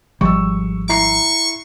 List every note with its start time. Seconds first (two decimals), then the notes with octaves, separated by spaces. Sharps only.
0.21 G#1 F3 G3 C#6 E6
0.89 E4 A#5 C#6 C7